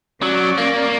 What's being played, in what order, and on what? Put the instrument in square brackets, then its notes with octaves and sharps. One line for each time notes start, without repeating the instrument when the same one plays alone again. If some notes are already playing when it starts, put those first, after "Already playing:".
[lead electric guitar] F#3 [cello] C#4 D5
[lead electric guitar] A#3